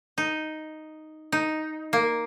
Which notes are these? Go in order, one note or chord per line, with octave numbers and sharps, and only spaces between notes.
D#4
D#4
A#3